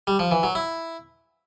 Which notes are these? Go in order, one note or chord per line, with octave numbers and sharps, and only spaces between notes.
G3
F3
E3
F#3
E4